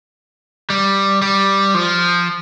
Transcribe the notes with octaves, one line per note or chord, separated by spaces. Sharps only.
G3
G3
F3